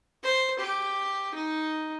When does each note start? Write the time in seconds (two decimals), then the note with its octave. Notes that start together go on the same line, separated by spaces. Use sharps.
0.24 C5
0.60 G4
1.35 D#4